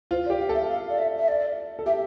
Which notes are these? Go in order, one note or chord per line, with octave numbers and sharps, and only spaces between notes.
F4 C5
D5
G4
F5
A4 E5
F5
D5
E5
E5
D5
A4
G4 E5